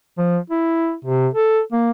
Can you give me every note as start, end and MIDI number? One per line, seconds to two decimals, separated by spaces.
0.18 0.38 53
0.50 0.94 64
1.05 1.28 48
1.34 1.61 69
1.72 1.91 58